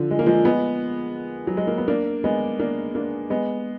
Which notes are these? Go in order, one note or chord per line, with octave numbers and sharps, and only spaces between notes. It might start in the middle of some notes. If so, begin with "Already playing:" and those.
Already playing: D3 F3
G#3
A#3
F3 G#3
G#3 B3
F#3
G#3
A#3
B3
A#3 D4
G#3 B3
A#3 D4
A#3 D4
G#3 B3